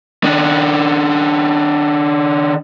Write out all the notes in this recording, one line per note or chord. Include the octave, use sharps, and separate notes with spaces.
D#3 D4